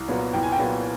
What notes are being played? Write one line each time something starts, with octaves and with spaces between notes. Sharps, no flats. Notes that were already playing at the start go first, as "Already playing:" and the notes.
Already playing: C2
A#2 F#3 B3
C2 G5
G#5
G5
A#2 F#3 B3